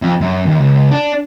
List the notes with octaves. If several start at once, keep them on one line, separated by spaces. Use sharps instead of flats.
F2
F#2
D#2
C#2
D4